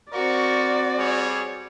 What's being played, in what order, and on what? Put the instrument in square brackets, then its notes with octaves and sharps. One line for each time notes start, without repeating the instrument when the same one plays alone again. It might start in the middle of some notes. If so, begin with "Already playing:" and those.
[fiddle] C4 F#4 [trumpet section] A#4 C#6 [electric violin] D5
[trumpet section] G3 G#4 C#5